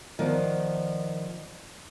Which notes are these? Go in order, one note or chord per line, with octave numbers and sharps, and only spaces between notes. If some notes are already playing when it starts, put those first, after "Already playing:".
D#3 F3 B3 D5